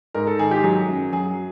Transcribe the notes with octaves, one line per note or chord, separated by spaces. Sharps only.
G#2 A#4
A4
D#3 G#4
G4
F#3 G#4
F#2
F#3 G#4